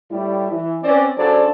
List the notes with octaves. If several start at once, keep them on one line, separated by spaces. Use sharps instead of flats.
A2 G3 E4
E3
C4 C#4 B4 D5
C#3 F#3 D4 A4 C5 D5